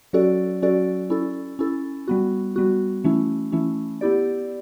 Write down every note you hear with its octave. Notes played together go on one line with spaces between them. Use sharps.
F#3 C#4 F#4 A4 D5
F#3 C#4 F#4 A4 D5
C#4 E4 A4
C#4 E4 A4
G3 B3 F#4
G3 B3 F#4
E3 A3 C#4 E4
E3 A3 C#4 E4
B3 E4 G4 D5